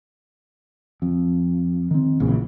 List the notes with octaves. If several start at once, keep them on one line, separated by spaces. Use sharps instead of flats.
F2
D#3 C4
A#1 A#2 C#3 E3